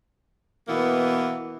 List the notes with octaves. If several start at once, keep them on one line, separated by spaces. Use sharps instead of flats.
B2 E3 A#3 B3